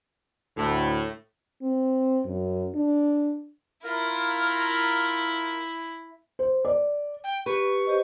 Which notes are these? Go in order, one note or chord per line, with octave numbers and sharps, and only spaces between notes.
D2 A2
C4
F#2
D4
E4 F4 A#4
C5
D5
G5
G4 B4 C#6
G4 C5 D#5